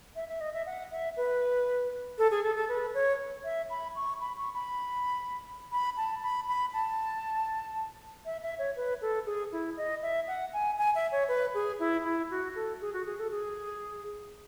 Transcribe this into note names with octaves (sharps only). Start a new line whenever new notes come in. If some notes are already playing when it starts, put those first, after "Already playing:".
E5
E5
D#5
E5
F#5
E5
B4
A4
G#4
A4
A4
B4
C#5
E5
B5
C#6
B5
C#6
B5
B5
A5
B5
B5
A5
E5
E5
C#5
B4
A4
G#4
E4
D#5
E5
F#5
G#5
G#5
E5
C#5
B4
G#4
E4
E4
F#4
A4
G#4
F#4
G#4
A4
G#4